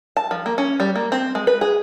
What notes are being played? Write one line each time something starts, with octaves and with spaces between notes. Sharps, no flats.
A5
F3
A#3
C#4
G3
A#3
C4
G#3
B4
G#4